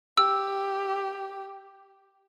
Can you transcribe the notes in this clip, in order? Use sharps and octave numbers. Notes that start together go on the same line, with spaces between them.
G4 E6